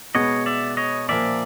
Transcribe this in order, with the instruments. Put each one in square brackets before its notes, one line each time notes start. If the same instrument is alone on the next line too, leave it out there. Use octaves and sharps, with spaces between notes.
[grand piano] B2 G#3 B3 [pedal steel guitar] C#5 D#5
[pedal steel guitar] D5 E5
C#5 D#5
[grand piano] A#2 F3 A#3 [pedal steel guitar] D5 E5